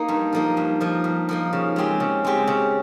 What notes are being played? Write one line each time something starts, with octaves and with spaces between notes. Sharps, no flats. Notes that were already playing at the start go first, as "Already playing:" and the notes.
Already playing: A#3 D#4
G2
F3 A#3 D#4
G2
F3 A#3 D#4
G2
F3 A#3 D#4
C#3
G#3 C4 G4
C#3
G#3 C4 G4
C#3